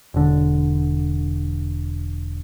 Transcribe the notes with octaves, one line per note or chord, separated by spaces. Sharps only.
E1 D3